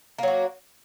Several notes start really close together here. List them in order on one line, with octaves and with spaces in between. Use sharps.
A#3 F#3 F#4